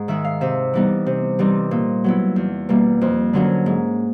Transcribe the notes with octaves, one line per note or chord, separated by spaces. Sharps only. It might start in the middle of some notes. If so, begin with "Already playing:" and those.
Already playing: G#2
D#3 G#3 E5
F5
C3 E5
E3 G3 B3 D#4
C3
E3 G3 C4 D#4
A#2
F#3 B3 E4
E2
B2 G3 A#3
F2
D3 F#3 A#3 C#4
G#2